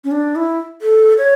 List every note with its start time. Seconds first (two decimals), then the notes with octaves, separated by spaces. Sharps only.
0.04 C#4
0.12 D4
0.36 E4
0.82 A4
1.18 C#5